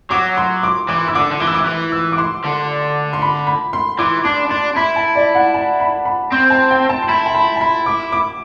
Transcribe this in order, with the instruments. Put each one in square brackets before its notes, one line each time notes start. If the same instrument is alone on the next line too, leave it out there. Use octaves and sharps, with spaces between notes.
[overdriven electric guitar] F#3 [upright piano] D6
[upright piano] C6
D6
[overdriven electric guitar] E3 [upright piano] D6
[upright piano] E6
[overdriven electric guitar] D3 [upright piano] D6
[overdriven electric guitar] D3
[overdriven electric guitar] E3 [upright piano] D6
[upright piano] E6
D6
[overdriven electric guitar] E3
[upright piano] E6
D6
C6
[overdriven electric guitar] D3
[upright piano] C6
B5
B5
C6
[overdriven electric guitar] E3 [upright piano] D6
[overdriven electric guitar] D4 [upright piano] D6
[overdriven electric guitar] D4 [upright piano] C6
[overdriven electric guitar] E4 [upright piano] B5
[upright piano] A5
D5
F#5
A5
B5
B5
[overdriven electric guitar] C4 [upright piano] C6
[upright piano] A5
G5
A5
C6
[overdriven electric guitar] E4 [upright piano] B5
[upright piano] A5
B5
A5
B5
D6
D6